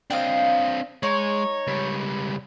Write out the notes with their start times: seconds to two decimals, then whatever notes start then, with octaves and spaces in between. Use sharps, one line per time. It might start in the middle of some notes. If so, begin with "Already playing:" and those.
0.10 C4 D4 D#5 F5 G5
1.03 G#3 D#4 C#5
1.67 C#2 G3